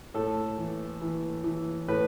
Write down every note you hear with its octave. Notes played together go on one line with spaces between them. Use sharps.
A2 A4
E3
E3
E3
A2 B4